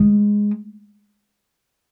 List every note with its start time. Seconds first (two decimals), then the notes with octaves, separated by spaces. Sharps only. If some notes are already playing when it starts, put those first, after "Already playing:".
Already playing: G#3